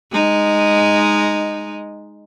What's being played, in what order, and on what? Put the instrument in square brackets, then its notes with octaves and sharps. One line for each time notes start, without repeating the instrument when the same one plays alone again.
[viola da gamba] G#3 D#4